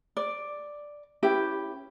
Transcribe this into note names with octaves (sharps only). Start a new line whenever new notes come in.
D5
C#4 E4 G4 B4